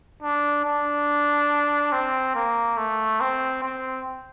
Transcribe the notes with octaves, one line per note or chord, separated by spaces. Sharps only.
D4
D4
C4
A#3
A3
C4
C4